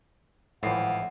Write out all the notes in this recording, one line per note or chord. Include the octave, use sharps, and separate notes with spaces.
G#1 A2 E3 F3 F#5 C7